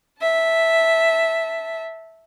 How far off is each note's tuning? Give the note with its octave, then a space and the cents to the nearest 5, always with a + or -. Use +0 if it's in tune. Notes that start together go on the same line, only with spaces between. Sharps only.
E5 -5 A5 +0